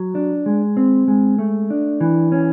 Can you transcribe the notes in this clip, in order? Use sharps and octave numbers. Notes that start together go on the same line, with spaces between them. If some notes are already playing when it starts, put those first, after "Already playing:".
Already playing: F#3
D4
G#3
C4
G#3
A3
D4
E3
C#4